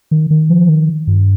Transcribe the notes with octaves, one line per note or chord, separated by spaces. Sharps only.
D#3
D#3
F3
D#3
G2